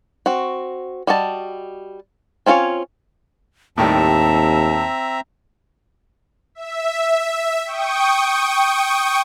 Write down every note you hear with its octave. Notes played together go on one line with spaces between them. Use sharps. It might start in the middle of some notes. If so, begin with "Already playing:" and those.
C4 F#4
G3 F#4 D#5 A5
C4 C#4 F4 A4 C#5
D#2 A2 D#3 G3 C4 E5 A5 A#5
E5
G5 C#6 D#6